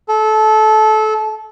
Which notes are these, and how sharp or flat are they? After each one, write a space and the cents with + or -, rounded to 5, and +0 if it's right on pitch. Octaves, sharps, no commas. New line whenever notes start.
A4 -25